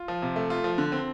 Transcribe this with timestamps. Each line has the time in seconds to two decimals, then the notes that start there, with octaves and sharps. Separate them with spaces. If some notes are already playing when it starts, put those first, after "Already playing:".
Already playing: F4
0.08 F3
0.22 C3
0.36 A3
0.50 F4
0.64 F3
0.78 D3
0.92 C4